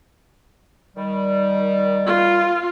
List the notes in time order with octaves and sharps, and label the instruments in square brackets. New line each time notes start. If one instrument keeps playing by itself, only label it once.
[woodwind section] D#3 G3
[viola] F4